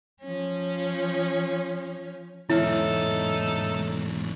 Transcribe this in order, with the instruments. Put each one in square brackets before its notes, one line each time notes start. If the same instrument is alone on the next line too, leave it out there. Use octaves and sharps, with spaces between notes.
[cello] F3 C#4
[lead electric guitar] E2 G#2 [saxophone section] D#4 A4 [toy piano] E4 [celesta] C#5 E5 F6